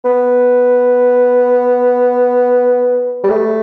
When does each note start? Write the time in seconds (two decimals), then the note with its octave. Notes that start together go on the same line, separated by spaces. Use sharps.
0.04 B3
3.24 G3
3.30 A3